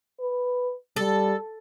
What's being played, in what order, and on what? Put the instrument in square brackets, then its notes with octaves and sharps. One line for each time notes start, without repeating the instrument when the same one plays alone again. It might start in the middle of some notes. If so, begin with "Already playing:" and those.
[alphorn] B4
[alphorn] G3 [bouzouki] A4